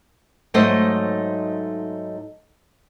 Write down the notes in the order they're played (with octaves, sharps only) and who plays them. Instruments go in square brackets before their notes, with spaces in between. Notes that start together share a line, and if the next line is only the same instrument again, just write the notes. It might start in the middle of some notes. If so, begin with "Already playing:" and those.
[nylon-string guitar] G#2 F#3 A3 D#4 C5 D#5